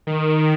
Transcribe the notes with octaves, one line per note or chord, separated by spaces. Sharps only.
D#3